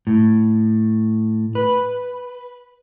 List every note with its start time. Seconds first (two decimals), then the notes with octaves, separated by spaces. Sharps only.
0.07 A2
1.55 B4